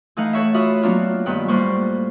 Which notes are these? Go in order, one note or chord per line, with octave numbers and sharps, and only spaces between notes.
E3 A3 D#4 F5 F#5 G6
A4 B4 C#5 E5
F4 F#4 B4 E5 B5 D#6
F#3 A#3 B3 D4 F4
G2 D#3 B3 B4 G5
A2 G3 A#3 B4 C5 C#6